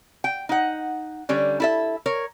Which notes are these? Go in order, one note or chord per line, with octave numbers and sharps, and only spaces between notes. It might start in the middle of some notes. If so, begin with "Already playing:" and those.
G5
D#4 F#5
D3 G3 C#4
E4 A4 E5
A#4 C#5